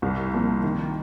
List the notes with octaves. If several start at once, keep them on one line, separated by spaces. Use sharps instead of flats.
C2
A#2 F3 A#3
D#3